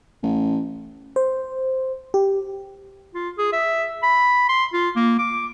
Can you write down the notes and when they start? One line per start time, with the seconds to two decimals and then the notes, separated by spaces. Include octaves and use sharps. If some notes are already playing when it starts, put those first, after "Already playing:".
0.23 A1
1.16 C5
2.14 G4
3.15 F4
3.38 G#4
3.53 E5
4.03 B5
4.49 C6
4.73 F4
4.96 A#3
5.19 D6